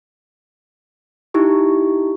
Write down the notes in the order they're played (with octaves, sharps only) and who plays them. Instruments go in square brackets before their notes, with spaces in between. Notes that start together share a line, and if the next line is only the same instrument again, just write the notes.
[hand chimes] D#4 E4 G4 C#6